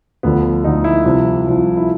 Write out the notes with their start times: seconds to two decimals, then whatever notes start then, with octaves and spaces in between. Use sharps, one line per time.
0.23 D2 D3 F3 B3
0.64 D2 D3 F3 D#4
0.84 E4
1.05 C2 C3 F3
1.47 C2 C3 F3
1.77 E4